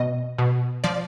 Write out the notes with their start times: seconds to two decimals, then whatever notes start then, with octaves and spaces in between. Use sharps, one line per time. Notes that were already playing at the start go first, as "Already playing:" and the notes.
Already playing: B2 D#5
0.38 B2
0.84 F3 D5